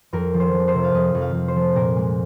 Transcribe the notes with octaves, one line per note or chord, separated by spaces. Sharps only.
F2 A#4
F3
C5
F3
C5
C3
F5
F2 D#5
F2
F5
F2
C5
F3
A#2 A#4
G#3